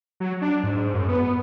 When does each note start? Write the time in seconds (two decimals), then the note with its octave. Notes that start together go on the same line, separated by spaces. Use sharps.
0.20 F#3
0.42 D4
0.63 G#2
0.94 F#2
1.09 B3